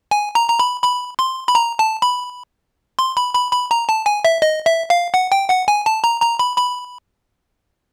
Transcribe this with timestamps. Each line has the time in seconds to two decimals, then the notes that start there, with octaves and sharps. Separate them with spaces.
0.11 G#5
0.35 A#5
0.49 A#5
0.59 B5
0.84 B5
1.19 C6
1.48 B5
1.55 A#5
1.79 A5
2.02 B5
2.99 C6
3.17 B5
3.35 B5
3.52 B5
3.71 A#5
3.89 A5
4.06 G#5
4.25 E5
4.42 D#5
4.66 E5
4.90 F5
5.14 F#5
5.32 G5
5.50 F#5
5.68 G#5
5.86 A5
6.04 A#5
6.22 A#5
6.39 B5
6.58 B5